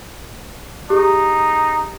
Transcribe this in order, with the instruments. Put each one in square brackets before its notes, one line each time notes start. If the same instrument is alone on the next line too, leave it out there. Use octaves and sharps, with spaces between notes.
[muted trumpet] D#4 [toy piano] G4 G#4